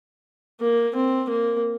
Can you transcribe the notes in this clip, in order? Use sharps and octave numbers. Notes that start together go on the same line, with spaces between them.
A#3
C4
A#3